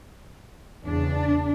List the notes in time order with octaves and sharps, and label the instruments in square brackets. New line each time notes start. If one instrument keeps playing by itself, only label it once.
[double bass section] E2 C#3 [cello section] D4